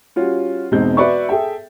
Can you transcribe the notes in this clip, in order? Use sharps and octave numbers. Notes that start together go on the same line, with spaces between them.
G3 C#4 F4 F#4
E1 B2 G#3 C4 D#4 G6
F#4 B4 D5 E5 C#6
G#4 A4 E5 G5